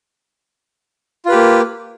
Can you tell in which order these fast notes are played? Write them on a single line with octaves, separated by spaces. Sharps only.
F4 B4 G4 A#3